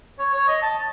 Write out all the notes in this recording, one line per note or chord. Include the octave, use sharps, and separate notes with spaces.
C#5
C#5
D#5
A5